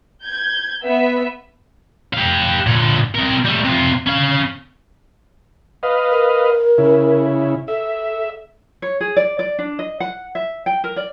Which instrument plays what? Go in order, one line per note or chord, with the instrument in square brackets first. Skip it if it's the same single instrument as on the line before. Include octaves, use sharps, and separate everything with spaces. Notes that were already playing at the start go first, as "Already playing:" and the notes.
[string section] G6 G#6
B3 E5
[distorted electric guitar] G4 F5
A#2 D3
C3 A#4
G3 A3
C3 F4
C#4 F5
[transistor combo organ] B4 D#5 F5
[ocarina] A#4
[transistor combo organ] C#3 E4
[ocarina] A4 [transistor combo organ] E5
[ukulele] C#5
G#4
D5
D5
D4
D#5
F#5
E5
G5
A#4
D5